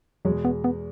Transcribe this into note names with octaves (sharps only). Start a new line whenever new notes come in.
E2 B2 F#3 G#3
B3
B3